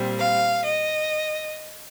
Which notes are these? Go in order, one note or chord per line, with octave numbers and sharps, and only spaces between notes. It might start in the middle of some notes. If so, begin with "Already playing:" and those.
Already playing: A#2 G3 C4
F5
D#5